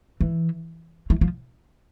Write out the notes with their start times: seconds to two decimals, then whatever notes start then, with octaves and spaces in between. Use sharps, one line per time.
0.21 E3
1.10 E3
1.21 F3